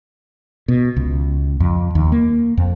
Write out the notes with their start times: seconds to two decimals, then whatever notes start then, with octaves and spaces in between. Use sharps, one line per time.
0.68 B2
0.97 C#2
1.60 F2
1.95 D#2
2.12 A#3
2.57 F2